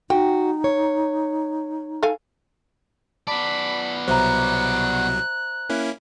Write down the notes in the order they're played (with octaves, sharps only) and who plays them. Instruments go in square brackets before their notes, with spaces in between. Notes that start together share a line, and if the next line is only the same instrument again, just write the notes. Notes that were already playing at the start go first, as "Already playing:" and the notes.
[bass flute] D#4 [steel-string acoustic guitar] F#4 [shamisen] G5
[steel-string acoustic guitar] C#5
[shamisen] A4 F5 G#5
[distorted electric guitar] B3 D5 [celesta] A5 [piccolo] B5
[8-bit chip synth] C2 B2 F#3 [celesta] C5 E5 A#5 [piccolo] F#6
[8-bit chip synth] A#3 C#4 E4